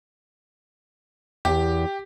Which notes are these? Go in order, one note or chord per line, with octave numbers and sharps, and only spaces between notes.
E2 G4